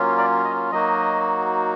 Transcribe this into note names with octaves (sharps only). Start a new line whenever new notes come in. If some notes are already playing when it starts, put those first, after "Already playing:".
Already playing: F#3 A#3 C#4 F4
D5
D#5
F#3 A#3 D#4 F#4 D#5